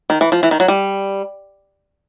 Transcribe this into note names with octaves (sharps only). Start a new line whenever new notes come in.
D#3
E3
F3
E3
D#3
F#3
G3